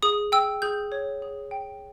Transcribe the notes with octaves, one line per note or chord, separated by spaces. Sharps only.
G#4 D#6
G5 E6
G#4 G6
C#5
G#4
G5